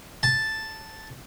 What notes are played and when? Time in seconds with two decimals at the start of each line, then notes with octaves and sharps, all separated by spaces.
0.23 A5